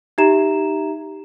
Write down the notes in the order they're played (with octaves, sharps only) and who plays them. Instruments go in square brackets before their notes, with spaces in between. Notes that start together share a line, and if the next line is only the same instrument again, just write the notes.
[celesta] D#4 G4 E5 A#5 E7